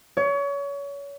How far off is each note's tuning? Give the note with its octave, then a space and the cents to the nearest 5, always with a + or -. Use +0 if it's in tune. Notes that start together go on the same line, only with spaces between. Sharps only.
C#5 +30